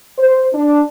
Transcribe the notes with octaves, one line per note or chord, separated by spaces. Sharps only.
C5
D4